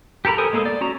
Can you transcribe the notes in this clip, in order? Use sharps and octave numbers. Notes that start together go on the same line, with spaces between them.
G4 A4 A#4 A#5 B5
A4 A#4 C5 G#5 D#6
G#3 A#3 G#4 A4
D5
C#4 F#4 A#5